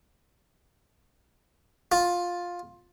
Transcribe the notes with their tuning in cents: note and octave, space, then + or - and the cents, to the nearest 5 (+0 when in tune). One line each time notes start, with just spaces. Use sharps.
F4 +10